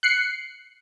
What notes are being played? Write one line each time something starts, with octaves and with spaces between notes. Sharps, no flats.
F#6 C7 C#7